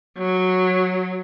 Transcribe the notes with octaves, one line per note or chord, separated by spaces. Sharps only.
F#3